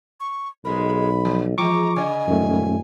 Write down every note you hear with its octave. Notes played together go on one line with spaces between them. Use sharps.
C#6
B1 G#2 G#3 A#4 B5
F3
E3 F3 G#3 A#5 C#6 D6
C#3 D5 D#5 G#5
D#1 F#2 A3